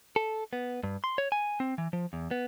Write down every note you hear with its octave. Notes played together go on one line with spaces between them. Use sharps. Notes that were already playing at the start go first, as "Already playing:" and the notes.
A4
B3
G2
C6
C#5
G#5
C4
E3
F3
E2
B3